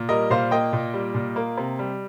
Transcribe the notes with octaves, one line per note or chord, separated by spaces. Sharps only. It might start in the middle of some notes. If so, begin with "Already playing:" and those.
Already playing: A#2
G3 A#4 D#5
A#2 C5 F5
A#3 D#5 G5
A#2
G3
A#2
A#3
C3
G3